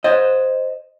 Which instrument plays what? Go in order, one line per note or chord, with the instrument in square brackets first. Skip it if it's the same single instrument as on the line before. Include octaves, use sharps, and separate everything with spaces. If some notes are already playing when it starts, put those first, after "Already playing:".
[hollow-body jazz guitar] C5 D#5